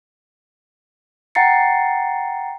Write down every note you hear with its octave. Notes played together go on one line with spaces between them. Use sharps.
F#5 G5 A#5 A6 C7 C#7